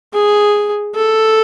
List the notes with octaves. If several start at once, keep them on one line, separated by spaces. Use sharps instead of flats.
G#4
A4